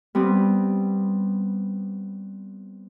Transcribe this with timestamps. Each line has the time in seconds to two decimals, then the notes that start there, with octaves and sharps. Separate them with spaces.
0.15 G3 B3 C4